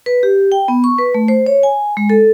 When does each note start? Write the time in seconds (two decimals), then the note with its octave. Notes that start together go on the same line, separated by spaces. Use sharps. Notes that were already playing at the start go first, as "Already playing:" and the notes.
0.06 B4
0.23 G4
0.52 G5
0.68 B3
0.84 C#6
0.98 B4
1.14 A3
1.28 C5
1.46 C#5
1.63 G#5
1.97 G#3
2.10 A4